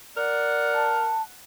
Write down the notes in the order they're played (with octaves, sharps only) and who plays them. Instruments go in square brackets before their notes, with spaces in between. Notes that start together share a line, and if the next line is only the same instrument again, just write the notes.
[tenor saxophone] A#4 [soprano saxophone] D5 [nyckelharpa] F#5
[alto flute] A5